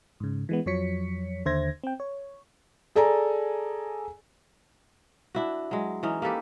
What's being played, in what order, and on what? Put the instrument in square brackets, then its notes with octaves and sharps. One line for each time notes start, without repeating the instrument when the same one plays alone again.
[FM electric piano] G#2 C#3
E3 G#3 B3
F2 F3 F#3 C#5 B6 C#7
D#2 D3 C5 E5 G#6 A#6
C4 G5
C#5
[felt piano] G#4 A4 D5 G#5 A#5
[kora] D4 E4 F#4
F#3 G#3
E3 C#4 D#4
A#3 G4 A4 B4